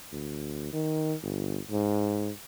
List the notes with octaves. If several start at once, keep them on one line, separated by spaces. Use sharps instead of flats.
D2
D#3
G1
G#2